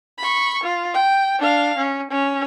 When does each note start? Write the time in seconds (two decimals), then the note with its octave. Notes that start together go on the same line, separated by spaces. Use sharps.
0.18 B5 C#6
0.63 F4
0.94 G5
1.39 D4 F5
1.78 C#4
2.11 C#4